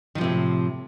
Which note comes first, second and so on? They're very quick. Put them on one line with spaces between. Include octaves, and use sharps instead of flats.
D#3 F3 C3 A2